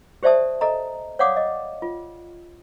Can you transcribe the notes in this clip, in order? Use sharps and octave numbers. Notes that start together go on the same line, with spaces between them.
G4 C5 D5 E5 A5 D#6
A4 D#5 A#5
C#5 D5 F5 F#5 D6 D#6
D#5
F4